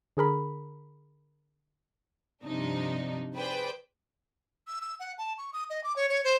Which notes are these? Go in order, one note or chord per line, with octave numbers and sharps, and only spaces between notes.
D3 G#4 A#4 B5
G2 C3 F3 D4 D#4
G#4 B4 C5 D5 G5
E6
E6
F#5
A5
C#6
D#6
D#5
D6
C#5
C#5
C5